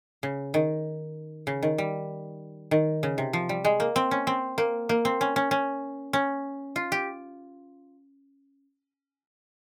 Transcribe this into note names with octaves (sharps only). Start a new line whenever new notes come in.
C#3
D#3
C#3
D#3
G3
D#3
C#3
C3
F3
G3
G#3
A#3
C4
C#4
C4
A#3
A#3
C4
C#4
C#4
C#4
C#4
F4
G4